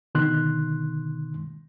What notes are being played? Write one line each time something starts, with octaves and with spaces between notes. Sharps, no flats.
B2 D3 D#3 C6 F#6